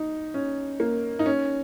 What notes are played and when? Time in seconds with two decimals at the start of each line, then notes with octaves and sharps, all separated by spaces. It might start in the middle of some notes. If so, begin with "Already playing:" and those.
Already playing: D#4
0.34 C#4
0.80 A#3
1.19 D#4
1.26 C#4